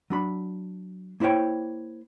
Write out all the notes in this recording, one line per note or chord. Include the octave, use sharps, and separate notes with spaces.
F#3 D4 B5
A#3 E4 C5 C#5 G5